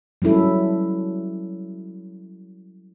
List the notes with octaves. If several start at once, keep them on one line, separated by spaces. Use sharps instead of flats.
F#3 G3 C#4 E4 A4